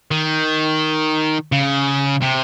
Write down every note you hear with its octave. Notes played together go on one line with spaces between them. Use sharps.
D#3
C#3
C3